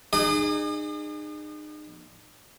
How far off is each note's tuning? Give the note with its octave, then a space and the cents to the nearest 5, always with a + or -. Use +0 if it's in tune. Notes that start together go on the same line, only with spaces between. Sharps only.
D#4 -40 G#4 -15 D#5 -45